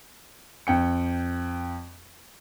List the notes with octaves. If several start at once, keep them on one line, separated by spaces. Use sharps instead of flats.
F2 G5 C#7